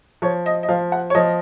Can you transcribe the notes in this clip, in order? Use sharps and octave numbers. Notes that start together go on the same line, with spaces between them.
F3 C#5
D#5
D#5
F3 F5
F#5
C#5
F3 D#5